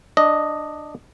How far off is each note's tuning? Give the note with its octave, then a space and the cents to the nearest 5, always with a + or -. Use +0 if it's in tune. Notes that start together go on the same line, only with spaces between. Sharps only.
D4 +15 D#5 +0